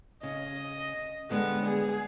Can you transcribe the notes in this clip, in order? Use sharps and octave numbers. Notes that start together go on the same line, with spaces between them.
C#3 D#5
D3 G3 G#3 B3
G#4